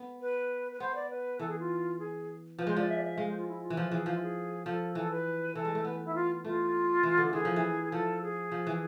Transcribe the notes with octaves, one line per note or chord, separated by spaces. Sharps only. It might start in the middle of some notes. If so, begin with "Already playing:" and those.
Already playing: B3
B4
B4
B3 C5
D5
B4
E3 A4
G#4
F4
G#4
F3 B4
G#3 C5
F3 D5
E5
D5
E5
G#3 F5
C5
F4
E4
F4
E3
F3 F4
E3 G#4
F3 F5
F4
G#4
F3 A4
E3 A4
B4
E3 A4
G#3
A3
B3 B4
E4
F4
A3 F4
E3
D3
E3 G#4
F3
E3
F3 A4
G#4
F3
E3